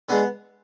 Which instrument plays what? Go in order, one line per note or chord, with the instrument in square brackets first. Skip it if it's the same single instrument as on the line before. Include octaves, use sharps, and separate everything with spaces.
[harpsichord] D3 G#3 B3